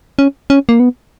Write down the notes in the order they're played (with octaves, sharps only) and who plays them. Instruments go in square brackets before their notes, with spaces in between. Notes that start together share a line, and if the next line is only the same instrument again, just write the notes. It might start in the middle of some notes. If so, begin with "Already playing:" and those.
[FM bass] C#4
C#4
A#3
B3